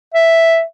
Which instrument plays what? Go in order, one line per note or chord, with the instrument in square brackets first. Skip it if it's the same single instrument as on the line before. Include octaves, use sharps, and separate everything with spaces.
[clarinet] E5